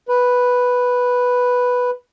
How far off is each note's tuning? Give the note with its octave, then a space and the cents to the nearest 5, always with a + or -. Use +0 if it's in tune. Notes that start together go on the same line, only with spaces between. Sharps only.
B4 +0